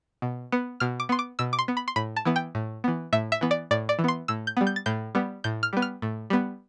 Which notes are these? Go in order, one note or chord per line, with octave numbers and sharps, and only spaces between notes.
B2
B3
B2 F6
D6
B3 C6
D6
B2 E6
D6
C6
B3
B5
C6
A2 B5
A5
E3 B3
G5
A2
E3 B3
A2 E5
E5
E3 B3
D5
A2 D5
D5
E3
B3 C6
A2 E6
G6
G3 B3
G6
A6
A2 G6
G3 B3
A2 G6
F6
G3 B3
F6
A2
G3 B3